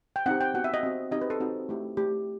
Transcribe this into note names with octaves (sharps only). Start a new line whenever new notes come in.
G5
C4 D#4 G4 F#5
G5
B3 F#4 F#5
E5
D#5
C4 F#4
C4 D#4 G4 D#5
B4
A4
C4 D#4 F#4
A3 E4 G4
A3 E4 G4